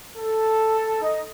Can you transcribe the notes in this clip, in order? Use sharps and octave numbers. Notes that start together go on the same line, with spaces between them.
A4
D#4 D#5